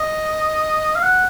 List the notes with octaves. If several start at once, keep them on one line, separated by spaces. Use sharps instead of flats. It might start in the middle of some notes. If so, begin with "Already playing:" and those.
Already playing: D#5
F5
F#5